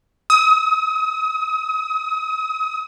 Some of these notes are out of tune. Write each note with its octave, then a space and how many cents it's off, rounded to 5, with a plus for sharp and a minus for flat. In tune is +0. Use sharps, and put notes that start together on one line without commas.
D#6 +35